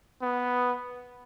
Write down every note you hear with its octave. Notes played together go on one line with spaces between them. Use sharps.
B3